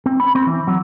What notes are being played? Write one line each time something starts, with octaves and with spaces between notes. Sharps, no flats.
C4
B5
C4
E3
F#3